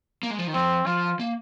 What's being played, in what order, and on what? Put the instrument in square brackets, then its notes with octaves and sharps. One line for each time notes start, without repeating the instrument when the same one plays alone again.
[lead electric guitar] A#3
G#3
F3
D#3
[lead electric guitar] F3 [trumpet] C4
[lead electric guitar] F3 [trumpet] F4
[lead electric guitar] A#3